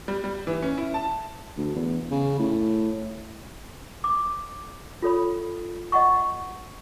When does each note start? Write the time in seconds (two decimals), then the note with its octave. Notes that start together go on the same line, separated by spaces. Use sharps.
0.08 G3
0.24 G3
0.47 E3
0.62 C#4
0.78 E4
0.94 A5
1.57 D2
1.75 E2
2.11 C#3
2.39 A2
4.04 D6
5.02 F4 A4 C#5 B5
5.92 D#5 F#5 C#6